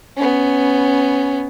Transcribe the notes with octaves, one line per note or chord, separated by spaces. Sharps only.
B3 C#4